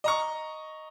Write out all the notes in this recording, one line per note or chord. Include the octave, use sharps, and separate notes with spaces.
D#5 A#5 C#6